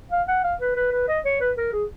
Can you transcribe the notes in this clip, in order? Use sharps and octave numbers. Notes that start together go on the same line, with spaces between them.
F5
F#5
F5
B4
B4
B4
D#5
C#5
B4
A#4
G#4